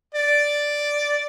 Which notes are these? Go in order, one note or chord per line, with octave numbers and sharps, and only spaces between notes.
D5